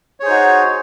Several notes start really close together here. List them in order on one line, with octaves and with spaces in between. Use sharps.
C#5 G#4 C5 D#4 F#4